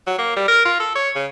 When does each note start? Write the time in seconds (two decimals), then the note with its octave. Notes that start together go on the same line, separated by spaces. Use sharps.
0.07 F#3
0.19 A#3
0.37 G3
0.48 A#4
0.65 F4
0.80 A4
0.95 C#5
1.16 C#3